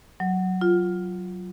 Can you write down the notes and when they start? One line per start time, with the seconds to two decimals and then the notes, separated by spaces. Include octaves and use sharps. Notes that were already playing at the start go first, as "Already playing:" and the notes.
0.20 F#3
0.61 F4